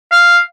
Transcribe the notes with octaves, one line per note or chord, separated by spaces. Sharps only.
F5